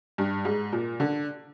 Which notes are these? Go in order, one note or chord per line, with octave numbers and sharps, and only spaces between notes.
G2
G#2
A#2
D3